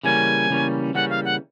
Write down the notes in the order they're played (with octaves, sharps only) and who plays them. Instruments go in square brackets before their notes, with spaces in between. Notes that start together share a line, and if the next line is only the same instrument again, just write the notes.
[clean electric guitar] C#3 E3 G3 A#3 C#4 [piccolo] G#5
[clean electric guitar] C#3 E3 G3 A#3 C#4
[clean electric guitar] C#3 E3 G3 A#3 C#4 [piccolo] F#5
[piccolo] F5
F#5